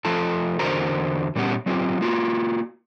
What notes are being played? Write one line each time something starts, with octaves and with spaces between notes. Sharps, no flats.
F3 A3 F4 A4 A5
E2 D3 F#4 A#4 C5 A#5
A#2 G3 B3 C#4 G4 F#5
F#3 C4 F4 G4
A#3 F4 F#4